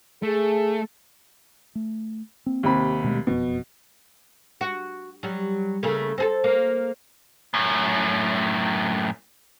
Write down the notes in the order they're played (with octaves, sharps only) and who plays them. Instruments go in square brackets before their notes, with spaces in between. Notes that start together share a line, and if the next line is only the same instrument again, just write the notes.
[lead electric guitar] A3 [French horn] G#4
[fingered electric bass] A3
A#3 C4
[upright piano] D#2 C3 B5
[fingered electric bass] B2 G#3 A3
[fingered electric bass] F#1 F2 [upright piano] B2
[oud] F#4
F#3 G3
C#3 A3 A#3
C4 G#4 A4
A#3
[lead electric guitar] F#2 A2